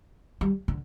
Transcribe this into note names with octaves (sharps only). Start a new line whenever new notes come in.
G3
D3